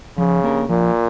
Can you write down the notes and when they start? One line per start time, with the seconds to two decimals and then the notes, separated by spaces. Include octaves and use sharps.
0.18 C#3 F3
0.44 A#3 D4 G4 A#4
0.69 A#2 F3